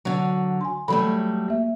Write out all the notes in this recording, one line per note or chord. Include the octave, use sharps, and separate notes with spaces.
D3 F#3
G#5 C6
E3 F#3 G3 A3 A4 B5
A#3 E5